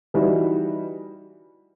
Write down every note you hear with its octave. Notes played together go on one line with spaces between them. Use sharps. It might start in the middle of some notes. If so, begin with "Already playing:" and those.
E3 G3 D#4 F#4